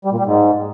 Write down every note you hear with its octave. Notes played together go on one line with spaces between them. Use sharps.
G3
A#2
G3
G#2